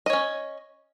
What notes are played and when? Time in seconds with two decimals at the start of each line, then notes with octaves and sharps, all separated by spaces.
0.06 D#5
0.10 C#5
0.13 C#4